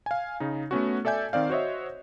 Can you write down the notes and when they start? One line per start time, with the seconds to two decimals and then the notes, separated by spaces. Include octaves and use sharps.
0.06 F5 G#5
0.40 C#3 D#4
0.71 A3 B3 C#4 F#4
1.05 A4 D5 E5 G#5 G6
1.33 D#3 C4 D5 F5
1.50 F#4 C5 C#5 D#5 E5